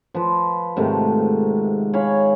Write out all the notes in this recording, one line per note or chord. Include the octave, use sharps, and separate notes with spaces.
F3 B4
G#2 C3 D#3 A3
C#5 F5 G#5 B5